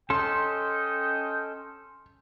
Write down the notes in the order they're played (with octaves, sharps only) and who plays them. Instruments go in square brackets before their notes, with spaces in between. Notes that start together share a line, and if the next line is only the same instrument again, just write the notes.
[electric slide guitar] C#4 A4 [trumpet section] D#5 G5 [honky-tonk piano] C6